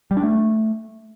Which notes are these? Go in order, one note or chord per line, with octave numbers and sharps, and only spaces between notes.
G3
D4
A3